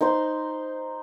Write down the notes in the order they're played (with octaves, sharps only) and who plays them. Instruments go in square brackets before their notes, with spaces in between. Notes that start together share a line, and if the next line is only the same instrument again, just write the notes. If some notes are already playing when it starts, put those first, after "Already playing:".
[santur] D#4 C5 C6